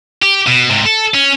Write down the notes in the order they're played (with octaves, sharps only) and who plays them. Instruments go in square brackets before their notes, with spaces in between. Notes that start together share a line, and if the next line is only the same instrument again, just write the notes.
[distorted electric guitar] G4
B2
G#2 C3
A4
C#4